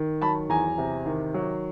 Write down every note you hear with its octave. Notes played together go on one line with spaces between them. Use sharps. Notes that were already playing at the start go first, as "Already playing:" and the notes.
Already playing: D#3
F#3 A5 B5
E2 G#5 A#5
C3
D#3
F#3